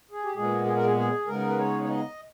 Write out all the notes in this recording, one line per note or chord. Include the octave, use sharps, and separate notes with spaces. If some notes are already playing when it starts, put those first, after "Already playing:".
G#4
G4
A#2 G#3 B3 G#4
G#4
A#4
G#4
G#4
C#3 G#3 B3 D#4 A#4
B4
C#5
C#5
D#5